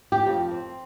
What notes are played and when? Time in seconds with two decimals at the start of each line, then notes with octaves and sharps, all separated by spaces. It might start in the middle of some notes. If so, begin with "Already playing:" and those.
0.12 G4
0.27 F2
0.51 C4